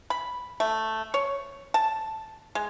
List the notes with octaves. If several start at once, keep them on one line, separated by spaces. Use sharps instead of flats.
B5
A3
C#5
A5
G#3